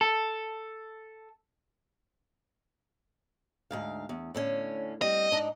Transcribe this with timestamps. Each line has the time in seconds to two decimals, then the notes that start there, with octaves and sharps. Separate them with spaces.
0.01 A4
3.71 D2 G#2 F5
4.09 E2
4.35 A2 D3 C#4
5.02 G3 C4 D#5
5.31 G#2 D4 D#4